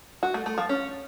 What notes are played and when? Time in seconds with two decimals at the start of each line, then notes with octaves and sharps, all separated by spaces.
0.23 F#4
0.34 A3
0.46 A3
0.58 F3
0.69 C#4